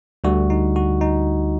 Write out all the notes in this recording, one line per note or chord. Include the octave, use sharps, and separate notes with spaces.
D2 D3 G3 F#4
D#4
F#4
D#4